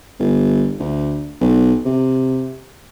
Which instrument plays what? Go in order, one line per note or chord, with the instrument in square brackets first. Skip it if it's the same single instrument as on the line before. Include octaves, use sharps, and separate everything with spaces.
[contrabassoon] G1
D2
B1
C3